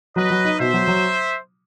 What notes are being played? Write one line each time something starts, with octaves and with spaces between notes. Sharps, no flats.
F#3 B4 D#5
F#3
D#4
B2 C5 E5
F#3
F#3